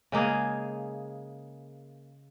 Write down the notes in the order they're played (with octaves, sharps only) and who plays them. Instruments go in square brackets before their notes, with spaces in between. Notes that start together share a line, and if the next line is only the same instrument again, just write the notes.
[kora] C#3 G#3 A#3 G#4